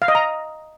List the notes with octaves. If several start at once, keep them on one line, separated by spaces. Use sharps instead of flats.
F5
D#5
A#5